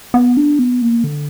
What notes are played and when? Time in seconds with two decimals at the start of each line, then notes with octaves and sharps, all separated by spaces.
0.14 B3
0.37 D4
0.59 B3
0.82 A#3
1.04 D3